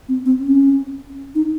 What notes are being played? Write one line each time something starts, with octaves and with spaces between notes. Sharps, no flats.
C4
C4
C#4
D#4